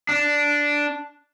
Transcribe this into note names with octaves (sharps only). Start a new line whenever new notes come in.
D4